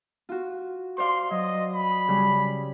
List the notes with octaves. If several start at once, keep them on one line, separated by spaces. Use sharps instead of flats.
F4 F#4
C5 D5 F5 C6
F#3 D#5
B5
C#3 G3 C#4